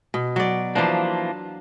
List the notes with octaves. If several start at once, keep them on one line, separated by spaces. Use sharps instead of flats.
B2
F#3 D5
E3 F3 A#3 D4 C5